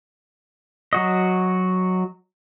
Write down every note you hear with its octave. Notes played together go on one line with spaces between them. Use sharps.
F#3 F#4 D#5